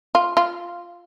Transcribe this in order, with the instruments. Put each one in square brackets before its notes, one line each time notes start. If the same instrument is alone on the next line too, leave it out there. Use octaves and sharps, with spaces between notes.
[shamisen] F4
F4